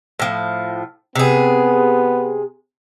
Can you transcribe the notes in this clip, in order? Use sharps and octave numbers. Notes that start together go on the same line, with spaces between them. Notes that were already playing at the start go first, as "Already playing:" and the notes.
A2 F3
C3 B3 G#4